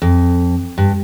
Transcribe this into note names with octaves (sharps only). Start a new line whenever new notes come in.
F2
G2